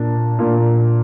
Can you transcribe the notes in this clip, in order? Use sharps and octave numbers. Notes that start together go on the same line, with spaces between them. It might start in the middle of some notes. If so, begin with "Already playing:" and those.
Already playing: A#2 A#3 D4
A#2 A#3 D4